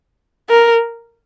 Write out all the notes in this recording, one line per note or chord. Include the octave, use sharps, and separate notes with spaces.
A#4